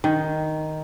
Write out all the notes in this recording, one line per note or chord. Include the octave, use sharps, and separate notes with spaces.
D#3